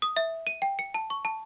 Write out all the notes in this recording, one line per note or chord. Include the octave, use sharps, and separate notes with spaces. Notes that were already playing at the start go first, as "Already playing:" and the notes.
D#6
E5
D#7
G5
C#7
A5
C#6
A5